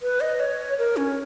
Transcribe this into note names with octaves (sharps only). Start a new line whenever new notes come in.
B4
D#5
C#5
A#4
C#4